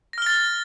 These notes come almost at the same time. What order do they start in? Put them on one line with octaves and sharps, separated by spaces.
A#6 F6 G7 A6